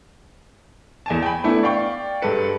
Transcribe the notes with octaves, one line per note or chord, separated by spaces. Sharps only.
E2 G#5 A5
G5 G#5 B5
A3 B3 D4 E4
D5 F5 G5 C#6
G2 G#3 A4 B4 C#7